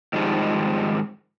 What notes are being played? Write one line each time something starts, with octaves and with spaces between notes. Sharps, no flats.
G#2 D#3 F3 G3